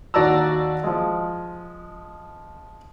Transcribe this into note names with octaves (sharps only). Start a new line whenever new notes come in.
D#2 F#4 D5 A5 A#5 E6
F3 G#3